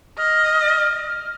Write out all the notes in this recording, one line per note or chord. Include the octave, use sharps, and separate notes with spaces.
D#5 F6